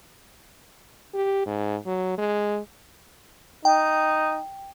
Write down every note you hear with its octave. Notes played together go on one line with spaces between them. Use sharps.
G4
G#2
F#3
G#3
D#4 G5